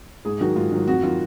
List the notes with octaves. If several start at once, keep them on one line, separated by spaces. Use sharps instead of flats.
G#2 G#4
D#3 F#3 F#4
G#2 F4
D#3 F#3
F2 F#4
D#3 F#3 F4